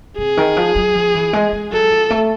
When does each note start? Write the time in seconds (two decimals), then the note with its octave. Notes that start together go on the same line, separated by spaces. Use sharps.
0.18 C3 G#4
0.37 D#3
0.57 F3
0.76 F#3
0.95 F3
1.14 E3
1.33 G#3
1.53 G#3
1.72 F#3 A4
1.91 F3
2.10 A3